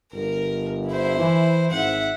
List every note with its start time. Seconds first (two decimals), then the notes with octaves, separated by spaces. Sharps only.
0.13 G1 A#4
0.87 E4 C5
1.19 E3
1.71 G#1 E5 F#5